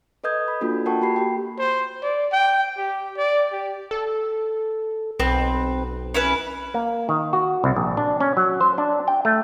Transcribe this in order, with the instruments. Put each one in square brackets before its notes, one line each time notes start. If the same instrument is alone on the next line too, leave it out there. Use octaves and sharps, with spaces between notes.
[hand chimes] A4 B4 D#5 D#6 G6 G#6
B5
A#3 D4 F4 F#4 A4
F4 A#4 F#5 G5 A5 C#6
A#3 F#4 G4 B5 C7
G4 G5
[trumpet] C5
D5
G5
G4
D5
G4
[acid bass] A4
[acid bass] B1 [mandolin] C4 B4
[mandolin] C#4 E4 B4
[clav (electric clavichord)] A#3
D#3
F#4
C2
A#1
D4
C#4
F#3
C5
D4
G5
A3